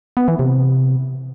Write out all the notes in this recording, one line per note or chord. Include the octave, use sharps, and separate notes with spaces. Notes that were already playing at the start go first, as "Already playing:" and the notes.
B3
E3
C3